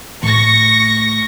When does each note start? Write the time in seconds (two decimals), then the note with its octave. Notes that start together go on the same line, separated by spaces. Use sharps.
0.23 A2 A3 C#6 A#6